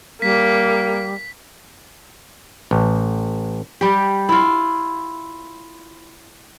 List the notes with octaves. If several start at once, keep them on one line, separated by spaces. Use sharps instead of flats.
G3 A#3 B6
A1
G3 G4
E4 F4